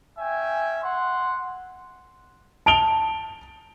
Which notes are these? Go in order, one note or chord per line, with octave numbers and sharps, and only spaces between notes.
C#4 E5 G5 G#5
F#5 C6
A5 D7 F7 G7